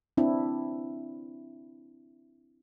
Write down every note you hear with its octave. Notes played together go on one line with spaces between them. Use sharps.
C4 D4 E4